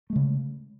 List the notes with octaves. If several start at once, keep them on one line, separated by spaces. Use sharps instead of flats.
C#3 G#3 A3